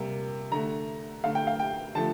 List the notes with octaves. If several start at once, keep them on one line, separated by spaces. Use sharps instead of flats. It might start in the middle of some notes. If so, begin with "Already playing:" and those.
Already playing: C3 G3 A#3
D3 A3 A#5
D3 A3 F5
G5
F5
G5
D3 F3 A3 A5